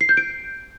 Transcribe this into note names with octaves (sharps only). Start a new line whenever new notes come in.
C7
G6
D7